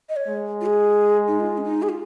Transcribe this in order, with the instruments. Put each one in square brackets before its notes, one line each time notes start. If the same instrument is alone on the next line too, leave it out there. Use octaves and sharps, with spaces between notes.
[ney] D#5
C#5
[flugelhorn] G#3
[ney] F4
G#4
D#4
F4
C#4
D#4
G#4
F4